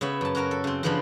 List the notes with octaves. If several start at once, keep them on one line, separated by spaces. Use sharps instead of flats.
C#3 B3 C#5 E5
F#2 A5
C#4 F#4 A#4 A5
A4
C#3 C4
C#3 E3 F3 B3 C4 D4